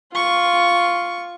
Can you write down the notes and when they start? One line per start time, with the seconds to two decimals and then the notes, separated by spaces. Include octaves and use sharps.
0.13 F4 C#6